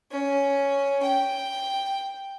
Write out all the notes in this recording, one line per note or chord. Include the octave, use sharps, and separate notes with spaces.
C#4
G5